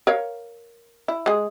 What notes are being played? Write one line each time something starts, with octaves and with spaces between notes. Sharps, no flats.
A#4 C#5 F5
E4
G#3 G#4